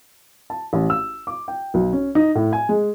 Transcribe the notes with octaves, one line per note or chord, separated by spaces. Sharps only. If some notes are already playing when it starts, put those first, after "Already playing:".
A5
A1
E6
D6
G5
B1
C#4
D#4
A2
G#5
G#3